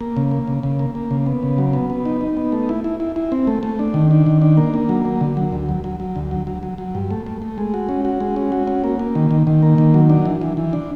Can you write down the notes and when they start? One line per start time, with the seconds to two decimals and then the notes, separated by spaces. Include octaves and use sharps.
0.01 A#3
0.17 C#3
0.31 A#3
0.47 C#3
0.63 C#3
0.79 A#3
0.95 A#3
1.11 C#3
1.26 B3
1.43 C#3
1.58 F#3
1.73 B3
1.90 B3
2.05 D#4
2.21 D#4
2.37 B3
2.52 A3
2.69 E4
2.84 E4
3.00 E4
3.16 E4
3.32 C4
3.47 A3
3.63 A3
3.79 D4
3.94 D#3
4.11 D4
4.26 D#3
4.42 D4
4.57 A#3
4.74 A#3
4.89 F#3
5.05 A#3
5.21 D3
5.37 F#3
5.52 D2
5.69 F#3
5.84 F#3
6.00 F#3
6.16 D2
6.31 F#3
6.47 F#3
6.63 F#3
6.78 F#3
6.95 G2
7.11 A3
7.26 A3
7.42 A3
7.58 G#3
7.74 F#4
7.89 C#4
8.05 F#4
8.20 G#3
8.36 C#4
8.52 F#4
8.67 C#4
8.84 A#3
8.99 A#3
9.15 D#3
9.31 D#3
9.47 D#3
9.62 A#3
9.78 D#3
9.94 F#3
10.10 D4
10.26 E3
10.41 E3
10.57 E3
10.73 D4